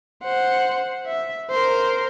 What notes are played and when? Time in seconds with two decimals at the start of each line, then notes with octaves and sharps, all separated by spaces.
0.24 C5 F#5
1.07 E5
1.51 A#4 C5